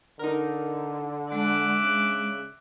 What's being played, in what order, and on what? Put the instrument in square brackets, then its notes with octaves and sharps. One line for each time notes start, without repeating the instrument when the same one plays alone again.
[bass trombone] D3 [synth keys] D#4 A#4
[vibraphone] G#3 [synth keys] D4 [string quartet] E5 D6 F#6
[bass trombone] C#3